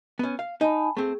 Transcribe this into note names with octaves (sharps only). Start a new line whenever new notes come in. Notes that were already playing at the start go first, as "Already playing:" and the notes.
B3 C#4
F5
D#4 G#5 A5 B5
A3 C4 G#4